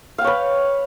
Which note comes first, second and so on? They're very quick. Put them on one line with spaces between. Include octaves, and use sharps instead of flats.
F5 G5 C#5 B4